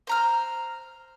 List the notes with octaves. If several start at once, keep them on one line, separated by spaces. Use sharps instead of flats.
C5 A#5 F6